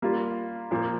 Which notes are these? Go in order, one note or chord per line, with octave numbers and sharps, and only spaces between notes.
G3 A#3 F4
A#2 F3 A#3